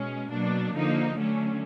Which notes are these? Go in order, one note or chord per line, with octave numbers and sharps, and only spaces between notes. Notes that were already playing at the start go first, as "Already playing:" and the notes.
Already playing: B2 G#3 C#4
B2 F#3 A#3 D4
D3 F3 A#3 D#4
D3 F#3 A3 C#4